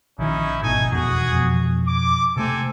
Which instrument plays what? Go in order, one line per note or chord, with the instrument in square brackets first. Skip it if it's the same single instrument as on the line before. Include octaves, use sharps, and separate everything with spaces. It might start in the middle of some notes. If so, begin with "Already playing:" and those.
[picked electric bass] A#1 D#3 [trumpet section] C#4 D#4 E4
[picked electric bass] G#1 B2 [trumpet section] A3 D#4 G#5
[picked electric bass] F1 E2 B2 [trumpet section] F#4 G#4
[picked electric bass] F2 B2
[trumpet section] D6
[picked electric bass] C3 A3 [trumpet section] C4 A4 G#5